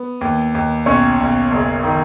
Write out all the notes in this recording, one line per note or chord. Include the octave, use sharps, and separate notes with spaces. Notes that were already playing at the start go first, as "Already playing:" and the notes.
Already playing: B3
D#2
D#2
B1 C#4 C#5
B1
F#1
D#3